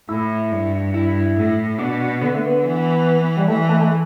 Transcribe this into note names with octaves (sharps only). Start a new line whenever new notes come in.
A2 E4
G2
E4
A2
B2 D4
D3 B3
A3
B3
E3
G3
E3 A3
A3
A3